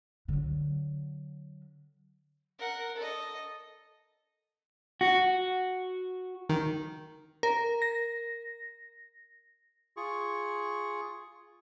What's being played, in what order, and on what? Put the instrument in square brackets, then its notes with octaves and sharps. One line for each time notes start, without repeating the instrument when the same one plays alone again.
[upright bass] D3 F#3
[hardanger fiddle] A#4 F#5
A4 D#5
[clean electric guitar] F#4
[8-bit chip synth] D#3
[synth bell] A#4
A#6
[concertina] F4 G#4 C#6